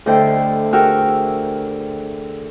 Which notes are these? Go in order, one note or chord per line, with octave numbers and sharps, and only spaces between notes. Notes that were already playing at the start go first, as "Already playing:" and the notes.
D2 E4 A4 C5 D#5 G5
F#4 G#4 A#4 G5 E6 F6